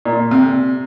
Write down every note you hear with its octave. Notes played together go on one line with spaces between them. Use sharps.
A#2
C3